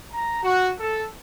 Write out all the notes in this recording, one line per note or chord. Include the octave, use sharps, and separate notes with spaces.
A#5
F#4
A4